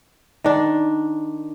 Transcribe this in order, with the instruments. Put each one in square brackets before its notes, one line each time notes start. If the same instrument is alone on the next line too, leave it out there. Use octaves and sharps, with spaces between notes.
[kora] D#3 D4